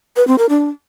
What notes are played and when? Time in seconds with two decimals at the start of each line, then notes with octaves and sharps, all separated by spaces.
0.17 B4
0.27 C4
0.38 A#4
0.49 D4